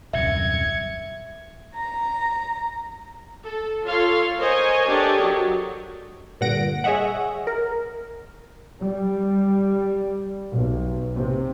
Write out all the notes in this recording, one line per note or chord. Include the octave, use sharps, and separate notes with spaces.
D#1 C2 F#2 E5 G#6 C#7
A#5
A4
F4 A4 C#5 F5 C6
A#4 C5 C#5 D#5 G#5
D4 G4 A4 A#4 C#5 D#5
F#3
G2 A#2 D3 F#5 A#6 D7
G#4 C#5 D#5 E5 F#5
A#4
G3
B1
C3